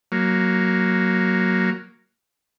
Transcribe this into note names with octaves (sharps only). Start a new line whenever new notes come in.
F#3 A#3